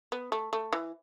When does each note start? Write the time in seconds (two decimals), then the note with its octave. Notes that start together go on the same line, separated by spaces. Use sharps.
0.12 B3
0.32 A3
0.53 A3
0.73 E3